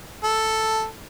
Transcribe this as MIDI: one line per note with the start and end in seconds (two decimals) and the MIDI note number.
0.23 0.87 69